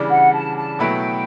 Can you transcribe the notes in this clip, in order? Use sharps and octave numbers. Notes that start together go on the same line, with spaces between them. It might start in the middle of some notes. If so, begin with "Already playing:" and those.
Already playing: C#3 E3 G3 D4
F#5
A5
A5
B2 F#3 A3 E4 B4 G5